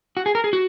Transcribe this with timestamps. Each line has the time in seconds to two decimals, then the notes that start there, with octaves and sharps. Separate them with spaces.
0.17 F#4
0.26 G#4
0.35 A#4
0.44 G#4
0.53 F#4